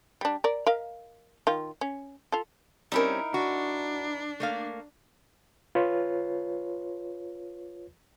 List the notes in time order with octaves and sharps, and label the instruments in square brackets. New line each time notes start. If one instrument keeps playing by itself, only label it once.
[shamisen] G3 D4
A#4 D5
A#4 D#5 F5
D#3 F4
C#4
F4 A4
[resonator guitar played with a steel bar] G3 C4 C#4 [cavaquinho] D#4 E4 A#4
[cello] D4 [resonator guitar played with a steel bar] F#4
[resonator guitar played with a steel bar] A3 A#3 F5
[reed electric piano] F4 B4 C#5